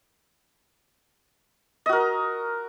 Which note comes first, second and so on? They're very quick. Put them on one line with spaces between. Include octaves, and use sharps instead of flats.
D#5 F#4 A#4